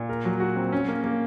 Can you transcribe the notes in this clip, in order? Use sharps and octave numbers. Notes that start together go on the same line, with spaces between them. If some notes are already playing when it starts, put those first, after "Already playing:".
Already playing: A#2
A#4
F#3
F#4
C4
C#4
A#3
A#3